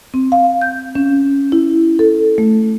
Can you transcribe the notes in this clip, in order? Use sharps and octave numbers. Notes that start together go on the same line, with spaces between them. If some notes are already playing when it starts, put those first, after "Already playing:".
C4
F5
G6
C#4
E4
A4
A3